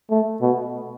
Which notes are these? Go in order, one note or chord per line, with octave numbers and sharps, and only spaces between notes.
A3
B2